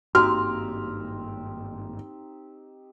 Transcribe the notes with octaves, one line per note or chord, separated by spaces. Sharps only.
G#1 G2 A#3 C4 D#4 F#4 G4 F6